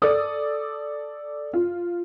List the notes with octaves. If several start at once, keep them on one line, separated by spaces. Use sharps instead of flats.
A4 D5 D#6
F4